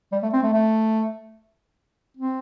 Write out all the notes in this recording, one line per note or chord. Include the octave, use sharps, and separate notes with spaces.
G3
A3
C4
A3
A3
C4